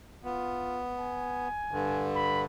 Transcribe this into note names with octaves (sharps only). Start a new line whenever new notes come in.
B3 F4
G#5
G2 D3
B5